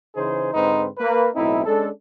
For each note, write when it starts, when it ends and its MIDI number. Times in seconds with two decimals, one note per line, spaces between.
0.16 0.53 49
0.16 0.53 52
0.16 0.53 63
0.16 0.53 68
0.16 0.53 72
0.54 0.88 44
0.54 0.88 50
0.54 0.88 60
0.54 0.88 63
0.54 0.88 71
0.54 0.88 72
0.98 1.28 58
0.98 1.28 71
1.35 1.65 35
1.35 1.65 45
1.35 1.65 60
1.35 1.65 63
1.35 1.65 64
1.66 1.88 56
1.66 1.88 61
1.66 1.88 62
1.66 1.88 69